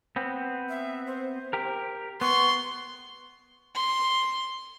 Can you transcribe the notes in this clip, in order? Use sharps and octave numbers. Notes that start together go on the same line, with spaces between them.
B3 C4
E5
C5
G4 A#4
B3 C6 C#6
C6